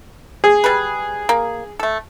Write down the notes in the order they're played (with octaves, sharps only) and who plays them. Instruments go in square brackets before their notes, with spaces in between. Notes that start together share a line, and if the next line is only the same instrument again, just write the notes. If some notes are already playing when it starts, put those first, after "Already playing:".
[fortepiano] G#4
[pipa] G3 B4
A#3
A3 A4